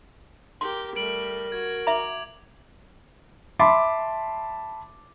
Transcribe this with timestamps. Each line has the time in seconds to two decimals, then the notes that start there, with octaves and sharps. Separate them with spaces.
0.61 G4 A#4 C6
0.96 G3 A3 A#4 D7 F#7
1.52 F#4 G#6
1.87 E5 A#5 D6 F#7
3.59 E5 A5 B5 C6 D6